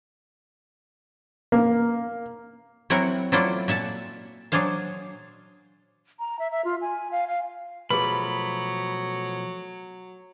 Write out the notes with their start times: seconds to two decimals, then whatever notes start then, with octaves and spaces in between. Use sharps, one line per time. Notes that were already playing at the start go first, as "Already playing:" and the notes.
1.52 A#3
2.90 F#3 C4 E4 A#4 F#5
3.32 F#3 A3 E4 F4 C5 D5
3.68 A#2 E5 F#5 A5
4.52 F#3 D4 G#4 C5 F5
6.20 A#5
6.39 E5
6.51 E5
6.65 F4
6.81 G#5
7.12 F5
7.27 F5
7.90 B2 F3 F#3 A3 G#4 B4 B5